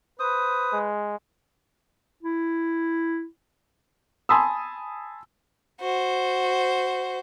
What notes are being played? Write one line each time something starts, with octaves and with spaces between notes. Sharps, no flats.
B4 C5 D#6
G#3
E4
G#5 A5 B5 C6 D#6 E6
F#4 C5